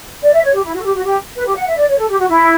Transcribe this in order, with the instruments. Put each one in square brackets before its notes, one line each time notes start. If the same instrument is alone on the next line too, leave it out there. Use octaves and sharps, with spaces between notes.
[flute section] D5
E5
C#5
G4
E4
F#4
A4
G4
F#4
G4
B4
G4
F#5
E5
D5
C#5
A4
G4
F#4
E4